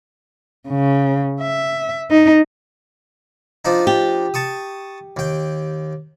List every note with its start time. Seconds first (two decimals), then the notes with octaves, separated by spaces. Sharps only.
0.68 C#3
1.42 E5
2.11 D#4
3.65 F3 D4 D#4
3.87 G4
4.34 A5 C#6 D#6
5.17 D#2 G5